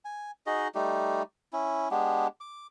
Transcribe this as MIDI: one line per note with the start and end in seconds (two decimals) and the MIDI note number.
0.05 0.31 80
0.47 0.68 63
0.47 0.68 66
0.47 0.68 68
0.47 0.68 75
0.75 1.22 55
0.75 1.22 57
0.75 1.22 63
0.75 1.22 67
1.53 1.88 61
1.53 1.88 64
1.91 2.27 56
1.91 2.27 59
1.91 2.27 62
1.91 2.27 67
2.41 2.67 86